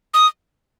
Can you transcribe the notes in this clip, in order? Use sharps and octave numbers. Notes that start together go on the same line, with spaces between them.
D#6